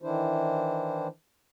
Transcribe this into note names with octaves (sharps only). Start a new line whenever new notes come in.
D#3 E3 D4 E4 C5